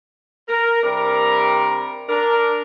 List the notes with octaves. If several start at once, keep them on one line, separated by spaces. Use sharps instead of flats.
A#4
C3 G3 D4 A#4
D4 A#4